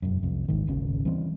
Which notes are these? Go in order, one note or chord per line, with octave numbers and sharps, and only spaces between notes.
E1 F#2
C2 F2
D1 G#1 G#2 D#3
D#1 G#1 C#3 C#4
E3 G3 C4